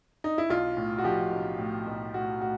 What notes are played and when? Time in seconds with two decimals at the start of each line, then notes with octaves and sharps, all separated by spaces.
0.24 D#4
0.38 E4
0.50 B1 F4
0.77 A2
0.98 F#4
1.04 F3 G4
1.32 B1
1.59 A2
1.87 B1
2.14 A2 F#4
2.41 A2 F#4